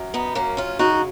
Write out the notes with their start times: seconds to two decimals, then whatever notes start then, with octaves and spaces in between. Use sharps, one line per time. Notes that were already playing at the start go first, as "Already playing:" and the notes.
Already playing: F#2
0.14 B3 D#4
0.35 F#2 A#3 C#4
0.57 C#4 F4
0.79 C#3 D#4 F#4